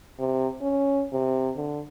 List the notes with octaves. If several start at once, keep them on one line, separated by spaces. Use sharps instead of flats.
C3
C#4
C3
D3